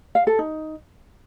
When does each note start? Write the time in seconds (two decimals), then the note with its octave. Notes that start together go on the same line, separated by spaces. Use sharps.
0.15 F5
0.27 A4
0.39 D#4